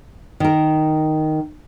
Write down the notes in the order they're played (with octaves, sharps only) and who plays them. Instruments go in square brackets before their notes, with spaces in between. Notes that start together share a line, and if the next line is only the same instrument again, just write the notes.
[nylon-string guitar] D#3 A#4